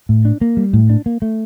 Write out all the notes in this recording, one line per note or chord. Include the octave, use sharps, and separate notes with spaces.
A2
D4
A#3
G3
A2
D4
A#3
A3